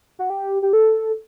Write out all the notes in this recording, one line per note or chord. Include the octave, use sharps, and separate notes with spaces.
F#4
G4
G4
A4